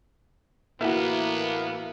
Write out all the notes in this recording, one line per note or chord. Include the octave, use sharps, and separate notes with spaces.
A2 E3 A#3 B3 E4 F#4